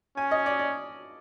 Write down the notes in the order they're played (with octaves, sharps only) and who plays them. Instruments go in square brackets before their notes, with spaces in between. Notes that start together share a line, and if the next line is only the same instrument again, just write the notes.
[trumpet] C#4 [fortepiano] G#5
[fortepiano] D#5
D5
D5